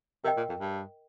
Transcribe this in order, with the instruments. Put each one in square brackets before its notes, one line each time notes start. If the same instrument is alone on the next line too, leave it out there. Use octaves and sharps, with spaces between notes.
[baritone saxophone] C3 [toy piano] A#4 D#5 G5
[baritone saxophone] A#2
F2
G2